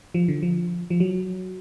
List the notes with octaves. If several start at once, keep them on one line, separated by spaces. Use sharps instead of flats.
F3
D3
F3
F3
F#3